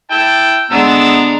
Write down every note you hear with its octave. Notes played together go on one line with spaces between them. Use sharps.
E4 G5 A5
D3 G#3 B3 D4 A#5 E6